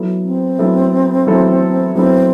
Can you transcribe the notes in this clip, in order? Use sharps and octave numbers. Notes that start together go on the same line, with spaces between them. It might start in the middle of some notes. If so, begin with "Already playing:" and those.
Already playing: F#3 B3 E4 A4
C4
F#3 B3 E4 A4
F#3 B3 E4 A4
F#3 B3 C4 E4 A4